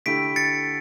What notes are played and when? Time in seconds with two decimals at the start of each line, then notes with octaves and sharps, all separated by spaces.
0.06 D3 A3 E4 G4 B6 D7
0.36 A6 C#7